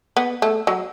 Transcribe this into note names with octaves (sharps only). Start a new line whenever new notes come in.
B3
A3
F#3